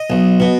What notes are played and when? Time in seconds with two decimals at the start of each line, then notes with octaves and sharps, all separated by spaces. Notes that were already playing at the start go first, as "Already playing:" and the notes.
Already playing: D#5
0.10 B1
0.40 B2